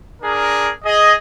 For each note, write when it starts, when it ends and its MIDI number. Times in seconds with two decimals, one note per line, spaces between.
0.22 0.70 62
0.22 0.70 68
0.22 0.70 70
0.84 1.14 68
0.84 1.14 75